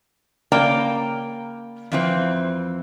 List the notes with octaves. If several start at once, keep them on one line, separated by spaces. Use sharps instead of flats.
C#3 A#3 D5 G5 A#5
F2 E3 C4